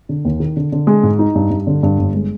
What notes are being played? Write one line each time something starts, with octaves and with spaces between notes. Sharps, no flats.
D3
D#2
D#3
D3
D3
G#3
G#2
D#4
G2
G2
D3
G2
G1
G#3